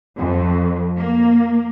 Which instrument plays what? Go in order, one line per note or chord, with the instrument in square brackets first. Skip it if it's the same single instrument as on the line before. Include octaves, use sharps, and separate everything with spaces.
[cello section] F2
A#3